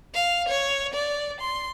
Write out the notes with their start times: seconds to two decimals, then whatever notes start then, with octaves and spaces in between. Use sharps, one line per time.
0.14 F5
0.49 C#5
0.94 D5
1.41 C6